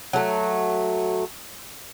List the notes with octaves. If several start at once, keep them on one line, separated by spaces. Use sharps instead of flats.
F#3 A3